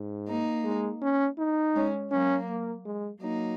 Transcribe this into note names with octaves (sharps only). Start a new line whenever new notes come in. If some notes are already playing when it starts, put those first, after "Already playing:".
Already playing: G#2
A#3 D#4
G#3
C#4
D#4
G#3 C#4
F#3 A#3 C#4
A#3
G#3
F#3 A#3 D#4